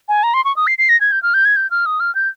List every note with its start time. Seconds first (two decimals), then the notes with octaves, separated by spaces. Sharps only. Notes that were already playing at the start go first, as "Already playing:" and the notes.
0.09 G#5
0.23 A#5
0.34 C6
0.45 C#6
0.56 D#6
0.67 C7
0.78 C7
0.89 A#6
1.01 G#6
1.12 G6
1.23 F6
1.34 G6
1.45 G#6
1.56 G6
1.71 F6
1.86 D#6
2.00 F6
2.15 G6